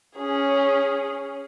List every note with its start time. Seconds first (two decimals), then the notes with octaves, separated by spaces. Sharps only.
0.16 C#4 G#4